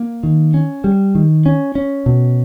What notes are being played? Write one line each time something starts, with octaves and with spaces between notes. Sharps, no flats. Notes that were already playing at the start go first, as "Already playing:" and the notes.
Already playing: A#3
D#3
C#4
G3
D#3
C#4
C#4
B2